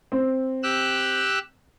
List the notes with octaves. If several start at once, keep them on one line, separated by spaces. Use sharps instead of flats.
C4
G4 E6 F#6